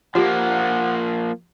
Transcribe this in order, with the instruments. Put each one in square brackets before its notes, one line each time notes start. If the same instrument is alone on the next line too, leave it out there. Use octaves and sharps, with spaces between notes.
[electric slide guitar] F3 A#3 [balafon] F4 G4 [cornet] F#5